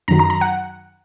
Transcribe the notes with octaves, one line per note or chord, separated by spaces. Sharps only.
F#2 D#3 F#3 A#5
A#5
A#5
F#5